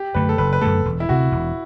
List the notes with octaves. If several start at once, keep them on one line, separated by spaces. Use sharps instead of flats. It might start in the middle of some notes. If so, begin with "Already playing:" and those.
Already playing: G4
F#2 D3 A3 B4
A4
F#1 B4
B4
F#2 D3 A3 A4
E1
E4
D2 C3 F#4
E1